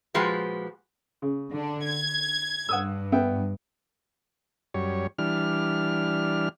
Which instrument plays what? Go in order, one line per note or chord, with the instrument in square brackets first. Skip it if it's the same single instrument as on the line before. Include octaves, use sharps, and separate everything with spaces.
[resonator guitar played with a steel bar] A#2 F3 G#3 F#4 G4 B4
[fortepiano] C#3
[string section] D3 D4
G#6
[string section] G2 [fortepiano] F#5 D#6 E6
[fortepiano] B3 E5 G5
[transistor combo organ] F#2 G3 C#5
E3 G3 D4 F6